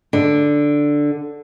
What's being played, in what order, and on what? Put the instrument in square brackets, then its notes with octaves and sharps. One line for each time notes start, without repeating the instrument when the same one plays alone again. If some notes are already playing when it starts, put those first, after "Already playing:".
[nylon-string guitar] D3